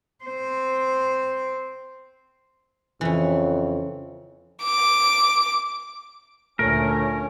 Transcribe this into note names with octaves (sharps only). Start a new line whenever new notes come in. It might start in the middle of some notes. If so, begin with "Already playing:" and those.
C4 C5
F2 C#3 E3
D6
D2 A#2 A3 C#4 A#4